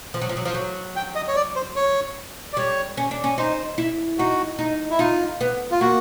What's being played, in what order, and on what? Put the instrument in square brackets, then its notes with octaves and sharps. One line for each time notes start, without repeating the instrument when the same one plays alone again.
[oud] F3
F#3
F3
F#3
F3
F#3
[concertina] G5
D#5
C#5
D5
C5
C#5
D5
[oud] G3 [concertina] C#5
[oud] C#4
D4
C#4
[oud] D#4 [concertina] C5
[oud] E4
[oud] D#4 [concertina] F#4
[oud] D#4
[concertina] E4
[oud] D#4 [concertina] F4
[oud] B3
[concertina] F4
[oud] A#3 [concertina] F#4